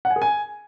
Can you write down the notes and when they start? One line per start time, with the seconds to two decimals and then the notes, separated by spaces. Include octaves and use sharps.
0.05 F#5
0.10 G#5
0.16 G#4
0.22 G#5